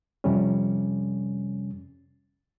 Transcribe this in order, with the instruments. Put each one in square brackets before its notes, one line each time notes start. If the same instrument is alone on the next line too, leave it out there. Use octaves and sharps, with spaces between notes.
[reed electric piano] F2 C3 G3 C#4